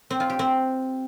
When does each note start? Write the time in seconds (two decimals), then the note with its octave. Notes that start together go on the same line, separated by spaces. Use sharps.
0.10 C4
0.20 F4
0.30 G4
0.39 C4